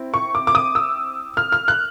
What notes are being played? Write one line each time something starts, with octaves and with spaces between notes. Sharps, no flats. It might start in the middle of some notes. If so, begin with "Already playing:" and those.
Already playing: C4 E4
C#6
D6
D6
D#6
E6
F6
F6
F#6